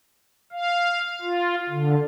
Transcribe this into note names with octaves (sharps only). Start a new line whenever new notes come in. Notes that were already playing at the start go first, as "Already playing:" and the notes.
F5
F4
D3